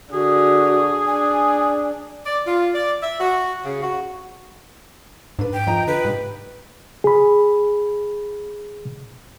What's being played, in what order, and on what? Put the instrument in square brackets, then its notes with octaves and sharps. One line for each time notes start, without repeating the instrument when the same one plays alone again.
[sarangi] D3 [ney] F#4 [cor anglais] G#4
[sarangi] D4 [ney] G#5
[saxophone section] D5
F4
D5
E5
F#4
C#3
F#4
[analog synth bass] G#2 [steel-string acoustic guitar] D4 B4
[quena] G5
[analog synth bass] F2 [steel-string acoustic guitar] F3 D#5 A#5
[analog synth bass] D3 [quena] B4
[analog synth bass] G#2 [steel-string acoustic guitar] C3 G4
[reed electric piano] G#4 B5